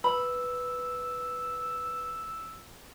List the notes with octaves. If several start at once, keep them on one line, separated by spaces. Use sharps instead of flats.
B4 B5 E6